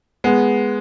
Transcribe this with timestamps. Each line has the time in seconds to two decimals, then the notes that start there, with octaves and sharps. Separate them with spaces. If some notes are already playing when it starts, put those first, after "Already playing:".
0.24 G#3 B3